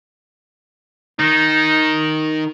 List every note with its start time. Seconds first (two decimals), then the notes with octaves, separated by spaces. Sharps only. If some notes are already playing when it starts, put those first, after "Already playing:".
1.19 D#3 D#4